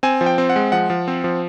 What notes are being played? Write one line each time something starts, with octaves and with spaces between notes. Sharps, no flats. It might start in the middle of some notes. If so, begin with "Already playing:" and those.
C4 G#5
F3
G5
C4
F#5
G#3
F3 F#5
F3
C4
F3